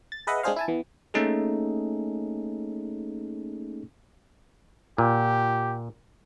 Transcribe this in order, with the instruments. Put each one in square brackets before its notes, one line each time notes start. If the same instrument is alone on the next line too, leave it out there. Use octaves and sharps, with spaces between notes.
[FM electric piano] A6
G#4 B4 D#5 E5 F#5
G#3 C4 D4 G#4 C5 F5
E4 G#5 A5
E3 B3
[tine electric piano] A3 A#3 C#4 D#4 G#4 A4
[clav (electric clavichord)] A#2 [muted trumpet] G4